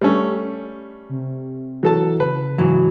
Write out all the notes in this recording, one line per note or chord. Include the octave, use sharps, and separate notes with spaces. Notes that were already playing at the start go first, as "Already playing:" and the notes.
G3 A3 C#4
C3
E3 F#3 A4 A5
C#3 B4
G#2 E3 F#3